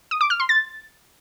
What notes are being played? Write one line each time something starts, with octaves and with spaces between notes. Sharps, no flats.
D#6
D6
F6
C6
A6